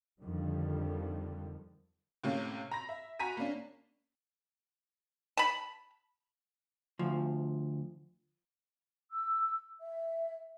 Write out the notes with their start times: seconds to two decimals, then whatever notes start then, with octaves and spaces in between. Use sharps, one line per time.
0.21 F2 D3 D#3 F3 G3
2.24 A2 C3 A#3 C#4
2.71 A#5 B5 A#6
2.89 E5
3.19 F#4 G#5 A#5 B5 B6 D#7
3.37 A#3 C#4 D4
5.37 A5 B5
6.99 D2 F3
9.11 E6
9.81 E5